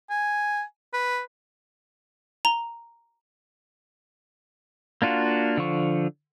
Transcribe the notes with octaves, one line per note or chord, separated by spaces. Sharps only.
G#5
B4
A#5 G7
A#3 D4 F4 F#4
D3 F3 C#6